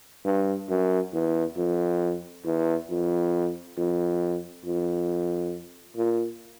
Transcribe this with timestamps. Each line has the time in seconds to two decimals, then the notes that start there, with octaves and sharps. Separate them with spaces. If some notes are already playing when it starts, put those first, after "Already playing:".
0.25 G2
0.69 F#2
1.14 E2
1.56 F2
2.45 E2
2.89 F2
3.77 F2
4.65 F2
5.96 A#2